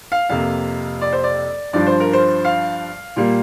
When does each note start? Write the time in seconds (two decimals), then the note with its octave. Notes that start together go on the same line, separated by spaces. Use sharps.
0.12 F5
0.29 F2 C3 A#3 F5
1.01 D5
1.13 C5
1.24 D5
1.73 G2 F3 D4 D5
1.87 C5
2.00 A#4
2.13 C5
2.45 F5
3.16 A#2 G3 A#3